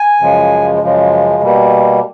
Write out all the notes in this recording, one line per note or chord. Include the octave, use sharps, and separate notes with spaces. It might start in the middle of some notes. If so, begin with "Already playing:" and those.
Already playing: G#5
F#2 C#3 F3 G#3
F#2 C#3 F3 G#3
B2 G3 A#3